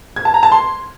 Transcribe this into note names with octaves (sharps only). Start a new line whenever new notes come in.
G#6
A5
A#5
A5
C6